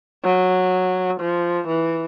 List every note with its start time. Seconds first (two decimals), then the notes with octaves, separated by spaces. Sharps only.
0.24 F#3
1.20 F3
1.68 E3